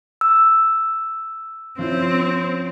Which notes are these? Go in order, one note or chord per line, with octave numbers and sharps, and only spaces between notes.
E6
F3 C4 C#4 E4